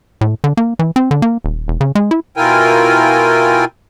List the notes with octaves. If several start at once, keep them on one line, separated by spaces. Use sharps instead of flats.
A2
D3
A#3
E3
C4
D3
A#3
D#1
E1
C#3
G#3
E4
B2 E4 F4 A#4 G5 G#5